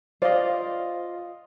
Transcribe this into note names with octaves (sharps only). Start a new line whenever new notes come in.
F4 C5 D5 D#5 F5